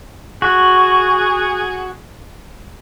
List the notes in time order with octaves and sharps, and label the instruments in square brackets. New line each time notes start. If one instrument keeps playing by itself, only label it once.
[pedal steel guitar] F#4 [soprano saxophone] G#4